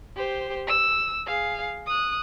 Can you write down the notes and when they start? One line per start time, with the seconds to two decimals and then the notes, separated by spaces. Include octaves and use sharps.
0.16 G4 C5
0.67 E6
1.26 G#4 F5
1.87 D#6 F#6